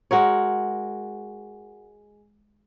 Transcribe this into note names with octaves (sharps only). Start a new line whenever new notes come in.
G#3 F#4 A#4 C#5